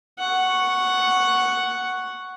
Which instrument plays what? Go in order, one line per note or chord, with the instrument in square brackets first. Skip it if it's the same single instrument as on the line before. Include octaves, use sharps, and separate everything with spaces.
[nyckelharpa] F#5 C#6